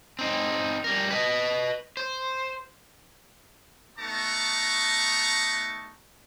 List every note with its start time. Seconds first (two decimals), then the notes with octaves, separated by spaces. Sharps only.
0.19 C4 D#4
0.84 G3 A#4
1.10 B4 D#5
1.97 C5
3.99 A3 B3 D#4 A5 A#5 C#6